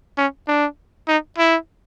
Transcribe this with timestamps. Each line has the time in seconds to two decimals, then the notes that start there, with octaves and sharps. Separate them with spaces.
0.17 C#4
0.48 D4
1.08 D#4
1.38 E4